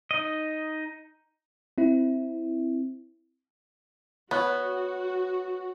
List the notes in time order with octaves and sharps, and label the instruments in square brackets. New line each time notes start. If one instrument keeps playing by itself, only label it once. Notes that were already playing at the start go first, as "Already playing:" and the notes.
[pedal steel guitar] D#4 D#5
[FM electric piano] C4 E4
[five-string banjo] B3 [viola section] F#4 [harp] C#5 F#6